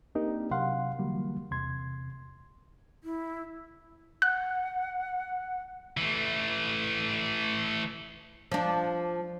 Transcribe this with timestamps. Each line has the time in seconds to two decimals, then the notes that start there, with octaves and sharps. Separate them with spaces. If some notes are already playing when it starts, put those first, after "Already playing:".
0.15 A#3 C4 D4 D#4 G4 A#4
0.51 C3 F#3 F5 F#5 C6
0.99 D3 E3 F#3 G3 A#3
1.51 E2 C3 C6 G#6
3.04 E4
4.22 F#5 F#6
5.97 E3 A3
8.52 F3 D4